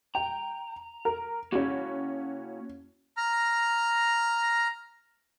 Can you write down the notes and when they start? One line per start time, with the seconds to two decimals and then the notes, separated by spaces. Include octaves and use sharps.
0.15 G5 A#5
1.05 A#4
1.52 A#3 C#4 E4 F#4
3.17 A#5 F6